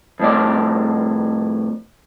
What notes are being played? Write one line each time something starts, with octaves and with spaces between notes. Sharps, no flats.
F2 A2 D5